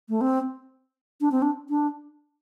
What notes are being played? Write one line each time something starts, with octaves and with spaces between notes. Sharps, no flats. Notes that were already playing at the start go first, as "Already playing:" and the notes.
A3
C4
D4
C4
D4
D4